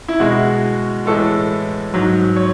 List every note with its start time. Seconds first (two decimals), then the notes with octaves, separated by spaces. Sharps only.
0.08 E4
0.20 B2 G#3 F#4
1.06 A2 E3 G#3 A4
1.94 G#2 F#3
2.36 C#5